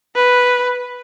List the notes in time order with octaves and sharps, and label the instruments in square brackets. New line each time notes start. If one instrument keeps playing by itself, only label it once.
[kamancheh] B4